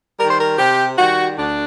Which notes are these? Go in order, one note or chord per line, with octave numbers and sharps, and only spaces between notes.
D#3 G3 A#4
C5
A#4
C3 G4
D#3 G3 F#4
D2 D4